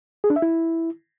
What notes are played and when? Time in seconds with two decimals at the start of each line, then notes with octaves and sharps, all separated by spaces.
0.24 G#4
0.30 D4
0.36 E5
0.42 E4